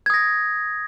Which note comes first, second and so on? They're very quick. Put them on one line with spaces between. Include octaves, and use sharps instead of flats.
G#6 D#6 A#6